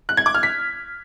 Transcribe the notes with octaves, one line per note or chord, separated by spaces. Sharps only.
F#6
G#6
D6
F6
B6